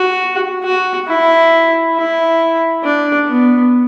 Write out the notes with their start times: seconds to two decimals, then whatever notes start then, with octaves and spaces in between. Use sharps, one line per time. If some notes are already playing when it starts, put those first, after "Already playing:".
Already playing: F#4
0.64 F#4
1.08 E4
1.96 E4
2.84 D4
3.28 B3